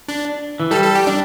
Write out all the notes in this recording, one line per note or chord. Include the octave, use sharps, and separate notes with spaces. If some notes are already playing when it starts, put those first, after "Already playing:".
D4
E3
G3 A4
A4
G4
D4